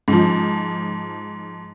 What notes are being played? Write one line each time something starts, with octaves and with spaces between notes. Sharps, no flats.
G#2 F3